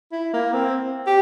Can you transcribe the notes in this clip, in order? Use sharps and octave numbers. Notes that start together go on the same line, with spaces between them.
E4
A#3
C4
G4